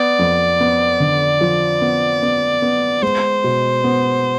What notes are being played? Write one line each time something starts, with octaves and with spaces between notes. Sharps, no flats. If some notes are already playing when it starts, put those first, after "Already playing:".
Already playing: B3 D5
F2
B3
D3
F3
B3
B3
B3
G#3 C5
B2
B3